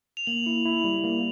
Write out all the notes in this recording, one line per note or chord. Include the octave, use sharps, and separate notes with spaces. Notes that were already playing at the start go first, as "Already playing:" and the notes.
F7
A#3 F#7
E4
E4
G3
A#3